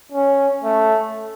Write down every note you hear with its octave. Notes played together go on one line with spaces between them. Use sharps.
C#4
A3